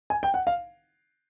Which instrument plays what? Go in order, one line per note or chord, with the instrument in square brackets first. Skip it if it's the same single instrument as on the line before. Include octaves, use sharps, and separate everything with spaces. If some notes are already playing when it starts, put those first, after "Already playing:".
[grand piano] G#5
G5
F#5
F5